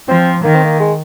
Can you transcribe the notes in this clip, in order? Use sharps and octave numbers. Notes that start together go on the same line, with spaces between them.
F3 C4
D#3 A#3
C4
A#3
G#3